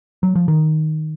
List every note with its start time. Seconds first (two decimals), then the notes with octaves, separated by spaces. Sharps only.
0.23 F#3
0.36 F3
0.48 D#3